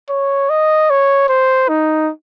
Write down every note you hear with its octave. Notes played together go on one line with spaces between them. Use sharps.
C#5
D#5
C#5
C5
D#4